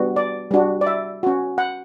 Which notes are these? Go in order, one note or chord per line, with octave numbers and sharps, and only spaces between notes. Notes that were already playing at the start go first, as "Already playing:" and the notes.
Already playing: G3 B3 D4 F#4
D5
G3 D4 F#4
D5
E5
C#4 F#4
F#5